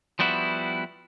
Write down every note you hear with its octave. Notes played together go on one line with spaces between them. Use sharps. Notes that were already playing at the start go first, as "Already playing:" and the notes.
F3 G3 B3 E4 F#4